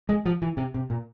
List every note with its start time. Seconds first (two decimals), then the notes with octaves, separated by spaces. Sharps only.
0.09 G#3
0.26 F3
0.42 E3
0.57 C3
0.74 C3
0.90 A#2